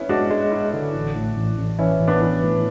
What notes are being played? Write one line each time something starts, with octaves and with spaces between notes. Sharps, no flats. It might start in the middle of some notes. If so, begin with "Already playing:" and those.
Already playing: B3 C#4 E4
G#3 D4 F#4
G#3
E4
D3
A1
A2
A1
A1
E3 C#4 E4
A1
B3 D4
E3
A2